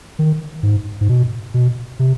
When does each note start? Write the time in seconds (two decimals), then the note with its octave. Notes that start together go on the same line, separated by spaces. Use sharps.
0.19 D#3
0.63 G#2
1.01 G#2
1.09 B2
1.54 B2
1.99 C3